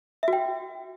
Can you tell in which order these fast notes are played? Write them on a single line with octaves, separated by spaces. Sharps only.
E5 F#4 G5